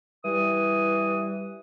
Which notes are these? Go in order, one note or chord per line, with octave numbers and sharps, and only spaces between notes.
E3 G3 D#6